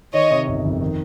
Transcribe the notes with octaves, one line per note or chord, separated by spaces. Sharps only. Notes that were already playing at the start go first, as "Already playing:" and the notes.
D#3 C#5 D#5
C3
G1
F2
D#3